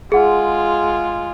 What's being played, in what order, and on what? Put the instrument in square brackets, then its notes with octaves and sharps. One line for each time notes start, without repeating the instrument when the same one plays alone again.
[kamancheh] G#3 F4 [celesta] G#4 F#5